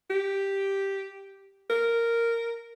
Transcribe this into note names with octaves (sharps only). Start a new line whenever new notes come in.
G4
A#4